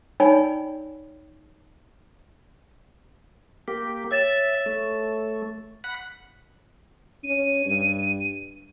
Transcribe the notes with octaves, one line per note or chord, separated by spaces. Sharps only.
D#4 C#5 D5 G5 G#5 B5
A#3 G4
C#5 E5 A6 E7
A3
F#5 B5
C#4 D#7
G2